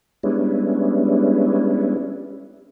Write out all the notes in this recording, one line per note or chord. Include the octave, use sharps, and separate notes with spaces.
G3 G#3 B3 C#4 D4 E4